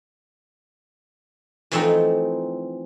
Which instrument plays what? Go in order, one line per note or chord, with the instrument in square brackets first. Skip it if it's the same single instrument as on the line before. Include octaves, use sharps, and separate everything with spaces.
[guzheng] E3 F3 A3 C4 D#4